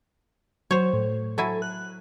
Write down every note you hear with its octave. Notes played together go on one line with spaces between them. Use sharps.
F#3 C5 C#5
A2
F#3 E4 A4 G#5
F#6